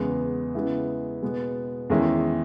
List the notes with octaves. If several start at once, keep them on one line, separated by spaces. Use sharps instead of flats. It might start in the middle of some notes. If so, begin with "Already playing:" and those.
Already playing: E2 C#3 G#3 B3
C#3 G#3 B3 E4
B2 G#3 B3
E2 D#3 G#3 C#4 E4